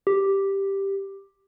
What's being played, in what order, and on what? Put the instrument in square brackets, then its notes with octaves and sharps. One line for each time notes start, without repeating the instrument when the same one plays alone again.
[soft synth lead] G4